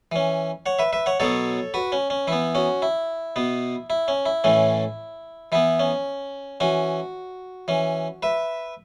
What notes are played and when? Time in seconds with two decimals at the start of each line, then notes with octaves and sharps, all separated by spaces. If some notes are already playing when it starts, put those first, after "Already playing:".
0.12 E3 C#4
0.66 C#5 F#5
0.79 B4 E5
0.93 B4 E5
1.06 C#5 F#5
1.20 B2 F#3 B3 A4 C#5
1.74 F#4 B4
1.92 C#4
2.10 C#4
2.27 E3 B3 E4
2.55 C#4 F#4
2.82 E4
3.36 B2 B3
3.90 E4
4.08 C#4
4.26 E4
4.44 A2 E3 A3 C#4
5.52 E3 B3 E4
5.79 C#4
6.60 E3 C#4 F#4
7.68 E3 C#4
8.23 B4 E5